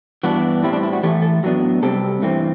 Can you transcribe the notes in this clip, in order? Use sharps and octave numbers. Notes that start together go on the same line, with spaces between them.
G2 E3 B3 D4 F#4
A2 G3 C4 E4
D4
E4
F#4
A2 E3 A3 G4
A4
A2 F#3 B3 D4
C3 G3 C4 A4
G2 E3 A3 C4